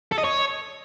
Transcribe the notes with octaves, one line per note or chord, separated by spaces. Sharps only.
A4
D#5
C#5